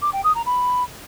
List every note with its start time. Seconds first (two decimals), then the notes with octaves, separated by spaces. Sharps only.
0.02 D6
0.13 G5
0.24 D#6
0.35 A#5
0.46 B5